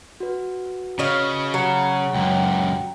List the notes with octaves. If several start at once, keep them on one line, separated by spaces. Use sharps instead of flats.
F#4 B4
C#3 C#5 D#5 F5
F#3 C#7
C#2 F#2 G5 A#5